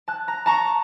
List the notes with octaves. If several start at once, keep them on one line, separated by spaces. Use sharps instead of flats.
A5 F#6
A#5
A5 A#5 C#6